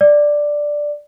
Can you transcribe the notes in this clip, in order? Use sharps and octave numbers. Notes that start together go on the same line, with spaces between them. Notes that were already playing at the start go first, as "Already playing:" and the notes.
D5